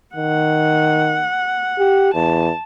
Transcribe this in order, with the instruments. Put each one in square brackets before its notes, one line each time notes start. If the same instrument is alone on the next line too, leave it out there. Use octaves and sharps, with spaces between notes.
[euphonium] D#3 [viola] F#5
[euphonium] G4
[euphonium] E2 [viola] A5